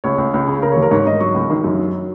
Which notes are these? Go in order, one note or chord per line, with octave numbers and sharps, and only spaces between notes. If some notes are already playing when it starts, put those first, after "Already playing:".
C#2 C#5
C#2
C#2
C#3
C#3 A#4
C#5
D#2
A#4
G#2 C#5
G#2 D#5
F#3 C#6
C#2
D#3
F#2
F#3